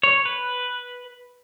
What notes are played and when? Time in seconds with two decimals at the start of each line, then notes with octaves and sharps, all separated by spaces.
0.03 C#5
0.25 B4